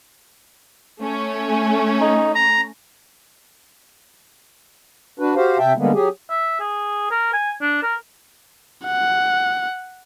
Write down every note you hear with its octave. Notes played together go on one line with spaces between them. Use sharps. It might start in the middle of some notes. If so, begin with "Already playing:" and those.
A3 C#4
D#4
A#5
D4 F#4 B4
F#4 G4 C5 F5
C3 E5 G5 A5
D3 G3 G#3 A#3 B3
F#3 G4 G#4
E5
G#4
A#4
G#5
D4
A#4
F#5